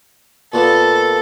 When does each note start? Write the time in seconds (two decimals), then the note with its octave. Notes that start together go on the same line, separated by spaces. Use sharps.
0.53 A#2 B3 A4